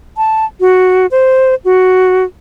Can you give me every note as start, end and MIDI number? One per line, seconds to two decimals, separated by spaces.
0.17 0.45 81
0.60 1.06 66
1.11 1.55 72
1.65 2.24 66